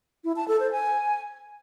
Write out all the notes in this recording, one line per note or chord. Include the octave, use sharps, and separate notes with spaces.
E4
A5
A4
C5
G#5